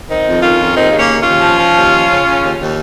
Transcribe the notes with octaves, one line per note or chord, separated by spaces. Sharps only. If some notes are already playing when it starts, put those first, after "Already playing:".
D#3 C4 D#4
F2
D#3 C#4 F4
F2
D#2 C4 D#4
C#3
A#3 C#4
D#2
C#4 F4
D#2
F3
F3
D#2
F3
C#3
C#3
D#2
D#2